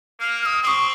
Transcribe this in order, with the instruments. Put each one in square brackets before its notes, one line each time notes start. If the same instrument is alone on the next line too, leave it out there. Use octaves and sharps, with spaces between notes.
[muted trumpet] A#3 [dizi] F6
[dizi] F6
D#6
[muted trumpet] C4 [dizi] D#6
[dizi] C#6